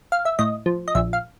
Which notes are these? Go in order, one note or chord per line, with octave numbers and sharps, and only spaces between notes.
F5
E5
A2 D#5
F3
D#5
A#1 E5
F5